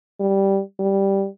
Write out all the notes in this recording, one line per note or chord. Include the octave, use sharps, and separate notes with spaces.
G3
G3